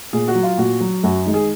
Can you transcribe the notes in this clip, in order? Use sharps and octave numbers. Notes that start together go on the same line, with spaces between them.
A#2 G#4
F#4
F#3
F4
A#2 F#4
F#3
F#2 F#4
D#3 G#3
G#4